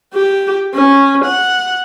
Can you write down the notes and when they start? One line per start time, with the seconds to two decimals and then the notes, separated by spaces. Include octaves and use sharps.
0.14 G4
0.75 C#4
1.25 F#5